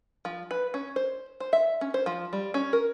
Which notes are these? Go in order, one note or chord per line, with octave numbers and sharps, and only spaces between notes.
F3
B4
C#4
C5
C5
E5
C#4
C5
F3
G3
C#4
A#4